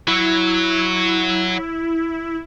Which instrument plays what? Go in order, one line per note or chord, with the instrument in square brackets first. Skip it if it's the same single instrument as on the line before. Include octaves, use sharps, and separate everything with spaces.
[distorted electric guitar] F#3 [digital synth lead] E4